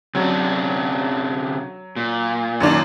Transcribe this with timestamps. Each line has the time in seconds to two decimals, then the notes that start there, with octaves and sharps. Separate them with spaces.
0.15 C3 F#3 C#4 D4
1.96 A#2
2.60 F#2 D#3 D4